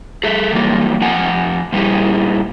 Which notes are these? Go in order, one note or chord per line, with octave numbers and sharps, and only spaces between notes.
G#4 A4 E5
E3 F#3 G3 A#3 D#4 F4
F2 F4 F#5 G#5
A#2 G3 E4 G#4